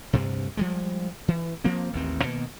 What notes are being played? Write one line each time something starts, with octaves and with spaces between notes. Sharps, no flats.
D2 G2 C3
F3 G3 G#3
E3
F3 A#3 C4
A1 D#2 C4
B2 D#3 A#3